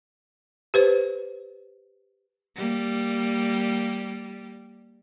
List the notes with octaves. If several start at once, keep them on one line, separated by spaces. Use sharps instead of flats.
G4 B4 C5
G3 A#3